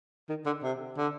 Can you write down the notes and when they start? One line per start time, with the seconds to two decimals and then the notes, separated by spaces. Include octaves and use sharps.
0.29 D#3
0.46 D3
0.63 C3
0.97 D3